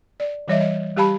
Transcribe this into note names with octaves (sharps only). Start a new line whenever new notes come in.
D5
E3 G3 C#5 D#5 E5
D#5
G3 G4 F5 A5 B5